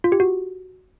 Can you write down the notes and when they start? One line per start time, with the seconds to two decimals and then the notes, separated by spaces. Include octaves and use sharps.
0.04 F4
0.12 G4
0.20 F#4